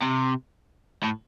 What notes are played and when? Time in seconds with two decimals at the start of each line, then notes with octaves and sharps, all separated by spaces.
0.03 C3
1.04 A2